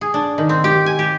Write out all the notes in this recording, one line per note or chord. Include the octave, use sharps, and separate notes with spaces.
G#4
D4
D#3
C4
G4
G#5
G4